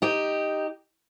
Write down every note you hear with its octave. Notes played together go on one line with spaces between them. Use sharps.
D#4 G4